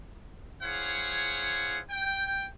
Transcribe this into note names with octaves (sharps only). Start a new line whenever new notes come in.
E4 G#4 C5 C#5 F5 F#5
G5